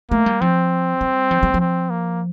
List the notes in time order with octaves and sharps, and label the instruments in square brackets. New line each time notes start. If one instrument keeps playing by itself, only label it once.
[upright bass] A3 [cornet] A#3
[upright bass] G3
[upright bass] F3 [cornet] C4
[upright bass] G3
F3
G3
F3
[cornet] C4
A#3